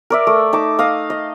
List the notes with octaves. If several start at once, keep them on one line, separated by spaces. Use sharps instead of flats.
A#4 D5 E5
A3
D#4 A5 D6
D#5 F5 D#6
D#5